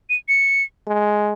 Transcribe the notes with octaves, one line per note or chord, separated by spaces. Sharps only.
D#7
C#7
G#3